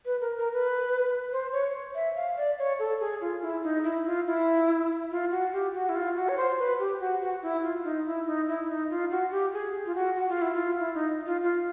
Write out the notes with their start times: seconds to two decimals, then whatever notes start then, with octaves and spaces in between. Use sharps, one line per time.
0.06 B4
0.21 A#4
0.38 A#4
0.53 B4
1.32 C5
1.53 C#5
1.95 E5
2.16 F5
2.37 D5
2.59 C#5
2.79 A4
3.00 G#4
3.21 F4
3.42 E4
3.64 D#4
3.84 E4
4.06 F4
4.27 E4
5.11 F4
5.31 F#4
5.53 G4
5.74 F#4
5.89 E4
5.96 F4
6.16 F#4
6.29 C#5
6.37 C5
6.59 B4
6.79 G4
7.00 F#4
7.21 F#4
7.42 E4
7.64 F4
7.84 D#4
8.06 E4
8.27 D#4
8.48 E4
8.69 D#4
8.90 F4
9.11 F#4
9.31 G4
9.54 G#4
9.86 F4
9.95 F#4
10.16 F#4
10.29 F4
10.42 E4
10.54 F4
10.79 E4
10.94 D#4
11.26 F4
11.43 F4